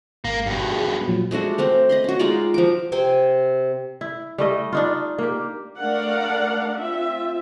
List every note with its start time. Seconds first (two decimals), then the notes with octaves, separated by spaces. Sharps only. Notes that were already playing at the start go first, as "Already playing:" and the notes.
0.25 G#1 A#3
0.46 G2 B2
0.72 G#4
1.08 A#2 F3 F#3
1.31 G#3 A3 D4 F#4
1.58 A3 C4 A#4
1.89 D#5 B5 C6
2.04 C#4 F#4
2.19 G#3 D#4 F4 D5
2.54 F3 F#4 D6
2.92 C3 C4 G5 G#5
4.01 E4
4.38 G3 A3 D#5
4.73 D4 D#4 F4
5.18 A#3 G4
5.78 A3 D4 A#4 D5 F5 F#5
6.77 C4 F4 E5